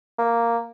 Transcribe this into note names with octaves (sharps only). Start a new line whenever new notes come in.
A#3